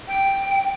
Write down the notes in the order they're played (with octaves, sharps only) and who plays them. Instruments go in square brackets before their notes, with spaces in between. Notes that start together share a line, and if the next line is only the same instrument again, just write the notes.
[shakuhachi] G5